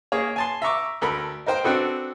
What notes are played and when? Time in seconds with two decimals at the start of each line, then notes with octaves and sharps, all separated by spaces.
0.12 A#3 G#4 C#5
0.36 G#5 A5 C6
0.62 E5 A#5 C#6 D6
1.02 D2 A4 A#4 B5
1.46 D#4 A#4 C5 G5
1.64 C4 D4 F#4 A4 B4